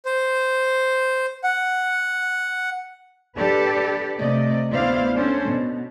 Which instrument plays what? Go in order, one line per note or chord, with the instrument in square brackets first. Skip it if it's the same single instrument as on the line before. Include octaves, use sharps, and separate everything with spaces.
[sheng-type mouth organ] C5
F#5
[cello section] D4 G4 A4 B4 D5
C3 A3 D5 D#5
D2 B3 E4 C5 D5 F5
C#4 D4 A4 C5
B2